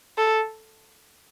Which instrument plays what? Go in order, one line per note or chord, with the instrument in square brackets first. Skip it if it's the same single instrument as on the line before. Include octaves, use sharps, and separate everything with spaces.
[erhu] A4